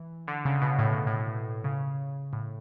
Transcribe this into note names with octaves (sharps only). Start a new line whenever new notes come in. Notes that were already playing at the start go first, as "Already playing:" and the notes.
Already playing: E3
D3
C#3
B2
A2
B2
A2
C#3
A2